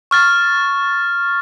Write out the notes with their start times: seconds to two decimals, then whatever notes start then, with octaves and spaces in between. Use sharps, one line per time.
0.11 C#6 F6 A6